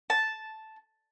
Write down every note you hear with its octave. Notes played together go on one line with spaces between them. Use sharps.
A5